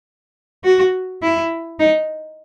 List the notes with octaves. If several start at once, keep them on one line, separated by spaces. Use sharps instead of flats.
F#4
E4
D#4